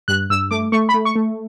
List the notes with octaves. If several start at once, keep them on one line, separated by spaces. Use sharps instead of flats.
G2 F#6
G2 E6
A3 D6
A3 C#6
B5
A3
C#6
A3